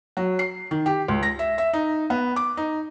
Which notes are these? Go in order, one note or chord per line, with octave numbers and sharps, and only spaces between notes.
F#3
C7
D#3
G4
C#2
A#6
E5
E5
D#4
B3
D6
D#4